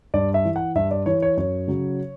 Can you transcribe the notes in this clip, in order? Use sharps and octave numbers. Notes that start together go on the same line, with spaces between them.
G2 D5
E5
E3
F#5
G2 E5
D5
E3 C#5
C#5
F#2 C#5
C#3 F#3